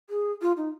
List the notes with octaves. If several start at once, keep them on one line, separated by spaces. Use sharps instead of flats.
G#4
F4
D#4